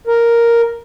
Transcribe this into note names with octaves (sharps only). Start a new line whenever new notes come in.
A#4